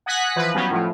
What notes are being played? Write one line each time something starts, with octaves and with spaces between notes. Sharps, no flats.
F#5 G#5 D#6 F#6 A#6 B6
E3 F3 B4
F#3 G3 B3 C#4
A2 F3